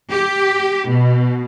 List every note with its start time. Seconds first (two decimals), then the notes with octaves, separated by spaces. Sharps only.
0.10 G4
0.87 B2